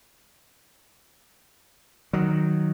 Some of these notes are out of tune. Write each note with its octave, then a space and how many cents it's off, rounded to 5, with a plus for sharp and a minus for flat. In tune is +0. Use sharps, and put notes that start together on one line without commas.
D#3 +0 F#3 +0